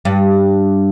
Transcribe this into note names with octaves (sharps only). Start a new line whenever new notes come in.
G2